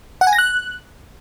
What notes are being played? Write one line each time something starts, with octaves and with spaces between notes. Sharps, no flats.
F#5
G#5
A#6
F#6